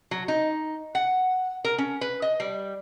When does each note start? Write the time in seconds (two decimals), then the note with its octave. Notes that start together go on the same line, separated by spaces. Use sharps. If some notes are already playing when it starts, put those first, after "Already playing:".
0.11 F#3
0.28 D#4
0.95 F#5
1.65 A#4
1.78 C#4
2.01 B4
2.22 D#5
2.40 G3